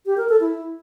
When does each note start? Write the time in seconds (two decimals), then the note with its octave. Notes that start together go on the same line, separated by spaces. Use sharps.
0.06 G4
0.17 A#4
0.29 A4
0.41 E4